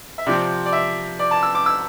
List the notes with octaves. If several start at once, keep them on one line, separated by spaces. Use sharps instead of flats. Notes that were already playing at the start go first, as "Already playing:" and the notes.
E5
C3 F3 C4 D5
D5
E5
D5
A5
E6
D6
E6